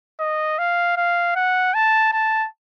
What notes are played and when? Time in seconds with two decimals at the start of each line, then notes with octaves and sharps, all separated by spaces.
0.20 D#5
0.59 F5
0.97 F5
1.36 F#5
1.74 A5
2.13 A5